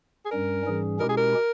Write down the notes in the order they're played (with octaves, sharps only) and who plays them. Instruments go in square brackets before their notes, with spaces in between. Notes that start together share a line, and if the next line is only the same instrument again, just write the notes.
[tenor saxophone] G#4
[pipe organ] G2 G3 C#4 [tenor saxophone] A#4
[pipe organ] G#2 E3 G3 C#4 G#4
[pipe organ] B2 G#3 C#4 E4 G4 [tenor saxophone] A#4
[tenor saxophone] G#4
A#4